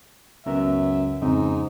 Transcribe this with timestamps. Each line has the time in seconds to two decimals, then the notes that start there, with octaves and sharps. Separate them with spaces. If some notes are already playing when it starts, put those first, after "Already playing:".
0.46 C#2 F#2 B3 A#4 E5
1.21 F2 G#2 C#3 C4 C#4 D#4